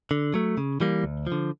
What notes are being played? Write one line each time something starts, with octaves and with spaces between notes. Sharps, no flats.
D3
F#3 A3
C#3
E3 G3 A#3
D2
F3
D3